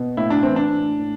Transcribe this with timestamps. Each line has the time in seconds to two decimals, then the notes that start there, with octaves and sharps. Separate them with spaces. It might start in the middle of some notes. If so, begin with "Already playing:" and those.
Already playing: B2
0.17 A2 E4
0.30 D4
0.43 E3 C4
0.56 D4
0.72 A2
1.00 A2